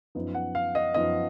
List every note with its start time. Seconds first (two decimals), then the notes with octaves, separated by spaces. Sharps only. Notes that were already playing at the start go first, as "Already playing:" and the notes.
0.15 F#2 F3 B3 D#4
0.35 F#5
0.55 F5
0.75 D#5
0.94 F#2 F3 B3 D#4 D#5